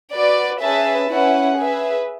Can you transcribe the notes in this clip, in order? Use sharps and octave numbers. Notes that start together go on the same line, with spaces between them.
F#4 B4 D5
C#4 G#4 B4 E5 A5
C#4 E4 B4 F#5
G#4 B4 E5